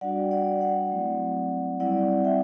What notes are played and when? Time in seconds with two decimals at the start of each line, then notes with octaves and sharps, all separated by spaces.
0.01 G3 D4 F#4 D5 F#5
0.20 G5
0.31 D5 F#5
0.61 D5 F#5
0.91 F#3 A3 C4 E4
1.80 G3 C4 E4 D5 F#5
2.24 E5 G5